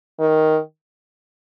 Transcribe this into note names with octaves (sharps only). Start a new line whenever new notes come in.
D#3